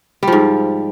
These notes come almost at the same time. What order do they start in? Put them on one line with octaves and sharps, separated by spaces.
G3 F3 G#2